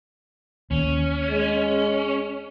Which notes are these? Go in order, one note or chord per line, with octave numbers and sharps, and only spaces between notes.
D#2 C#4
G#3